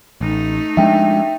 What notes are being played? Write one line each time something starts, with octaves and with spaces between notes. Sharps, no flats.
A1 A3 D#4
F3 G#3 D4 E5 G5